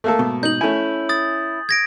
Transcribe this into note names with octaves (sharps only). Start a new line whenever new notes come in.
A3 A#3 A4
G#2 B2
D#4 G6 F#7
A3 C#4 E4 G#5
D#6 A6
G#6 A#6 D7